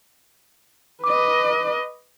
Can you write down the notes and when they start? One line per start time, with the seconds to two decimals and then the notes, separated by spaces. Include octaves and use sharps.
1.04 B4 D#5 D6